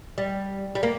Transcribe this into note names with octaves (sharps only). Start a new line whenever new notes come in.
G3
G3
A#3